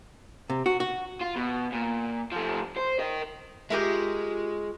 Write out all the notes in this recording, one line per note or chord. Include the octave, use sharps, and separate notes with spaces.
C3
F#4
F#4
F4
B2
A#2
F3 A3
C5
A#4 D#5
G#3 F4 G4 A#4 E5 C#6